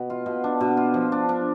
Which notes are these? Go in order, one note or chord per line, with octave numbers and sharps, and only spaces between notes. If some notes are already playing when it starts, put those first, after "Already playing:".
Already playing: B2
F4
B2
D4
B2
F4
F3
D4
D4